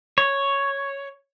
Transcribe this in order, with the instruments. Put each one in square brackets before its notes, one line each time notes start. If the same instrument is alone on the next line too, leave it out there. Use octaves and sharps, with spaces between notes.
[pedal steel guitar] C#5